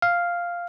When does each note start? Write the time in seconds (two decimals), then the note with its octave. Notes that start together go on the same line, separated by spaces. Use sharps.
0.02 F5